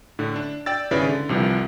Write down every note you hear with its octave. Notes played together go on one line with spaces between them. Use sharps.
A2 D3
D4
D5 G5 E6 A6
G#1 C#3 E4 B4 D5
D3
C2 C3 E3 F3